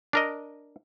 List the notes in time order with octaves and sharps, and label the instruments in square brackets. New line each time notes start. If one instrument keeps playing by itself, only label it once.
[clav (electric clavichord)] D4 A#4 D#5